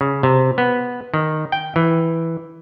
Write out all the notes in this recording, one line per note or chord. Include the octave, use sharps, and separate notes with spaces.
C#3
C3
B3
D#3
G5
E3